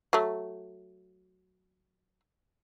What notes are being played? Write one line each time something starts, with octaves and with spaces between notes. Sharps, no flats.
F#3 A3